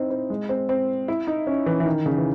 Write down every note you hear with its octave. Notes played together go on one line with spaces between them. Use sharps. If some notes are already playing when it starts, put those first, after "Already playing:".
Already playing: C4 D#4 E4
C4
G#3
C4
C4
E4
D#4
C#4
E3
E3
D#3
C#3
E3